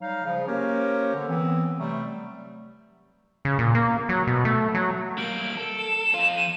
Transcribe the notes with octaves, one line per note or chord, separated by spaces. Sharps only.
F#3 G3 D#4 F5
C#3 F3
A#3 C#4 G4 A#4 C5 C#5
D3
E3 B3 C4
C3 F#3 G3 A3
C#3
A#2
A#3
F#3
B2
A3
F#3
G3 A#3 D7
A4
E7
F2 F4
D#7